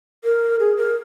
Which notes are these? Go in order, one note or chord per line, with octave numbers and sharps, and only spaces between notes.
A#4
G#4
A#4